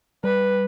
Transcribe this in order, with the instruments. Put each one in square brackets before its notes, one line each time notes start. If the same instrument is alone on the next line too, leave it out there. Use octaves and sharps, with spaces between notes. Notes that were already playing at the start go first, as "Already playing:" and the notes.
[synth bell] G3 [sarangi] B4